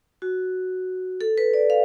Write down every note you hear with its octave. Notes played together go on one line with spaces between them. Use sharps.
F#4
A4
B4
D5
F5